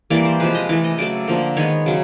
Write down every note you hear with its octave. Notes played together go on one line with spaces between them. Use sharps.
E3 G3 A#3 D5
C5
C3 F3 G#3 B4
D#5
E3 A3 D5
D#5
C#3 F#3 A3 D5
D3 F3 A#3
D#3 G#3 B3 C#5
C#3 F#3